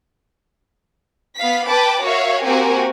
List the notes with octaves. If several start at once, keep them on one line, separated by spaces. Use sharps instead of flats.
B3 F5 B6
B4 G5 A5 B5 D6
F#4 A#4 C#5 E5 F5
A#3 C4 F#4 G4 A#4 G#5